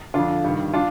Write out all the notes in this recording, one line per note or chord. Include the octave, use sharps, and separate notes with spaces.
F2 D3 D4 F4
G2 D#3
D4 F4